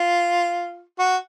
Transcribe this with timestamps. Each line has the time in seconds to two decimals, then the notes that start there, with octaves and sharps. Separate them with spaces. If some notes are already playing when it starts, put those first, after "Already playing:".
Already playing: F4
0.99 F#4